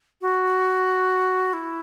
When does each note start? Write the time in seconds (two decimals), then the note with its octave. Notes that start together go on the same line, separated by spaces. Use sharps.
0.21 F#4
1.53 E4